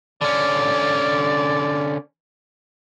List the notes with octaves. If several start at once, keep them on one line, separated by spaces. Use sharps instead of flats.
D3 C#4 D5